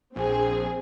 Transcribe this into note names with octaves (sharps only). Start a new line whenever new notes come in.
A#1 C4 G#4